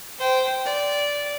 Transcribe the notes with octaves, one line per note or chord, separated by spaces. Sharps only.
C5 G5
D5